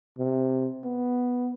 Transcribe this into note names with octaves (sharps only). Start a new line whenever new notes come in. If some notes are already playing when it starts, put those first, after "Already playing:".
C3
B3